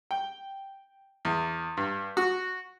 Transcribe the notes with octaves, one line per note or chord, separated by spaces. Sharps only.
G5
E2
G2
F#4